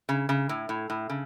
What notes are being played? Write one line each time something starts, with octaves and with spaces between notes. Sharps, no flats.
C#3
C#3
A2
A2
A2
C#3